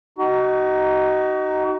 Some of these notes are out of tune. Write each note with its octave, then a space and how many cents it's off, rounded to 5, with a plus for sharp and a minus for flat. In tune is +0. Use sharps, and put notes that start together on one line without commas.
D#4 +0 F#4 +35